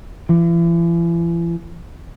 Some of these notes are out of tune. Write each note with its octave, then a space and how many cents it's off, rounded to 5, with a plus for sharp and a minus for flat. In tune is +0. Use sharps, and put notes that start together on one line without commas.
E3 +40